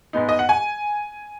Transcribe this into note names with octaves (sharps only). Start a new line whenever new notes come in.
G#2 G#3 B3 D#4
D#5
F#5
G#5